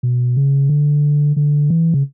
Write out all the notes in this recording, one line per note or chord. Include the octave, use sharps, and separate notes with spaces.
B2
C#3
D3
D3
E3
C#3